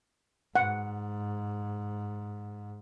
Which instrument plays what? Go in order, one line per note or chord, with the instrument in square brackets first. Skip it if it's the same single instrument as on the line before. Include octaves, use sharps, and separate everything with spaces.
[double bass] G#2 [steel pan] F#5